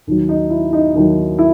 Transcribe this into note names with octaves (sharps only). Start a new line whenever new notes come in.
D#2 D#3 F#3
D#4
E4
D#4
D#2 D#3 F#3 D#4
E4